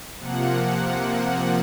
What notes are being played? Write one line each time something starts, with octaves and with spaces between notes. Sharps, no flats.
C3 F3 A#3 F#5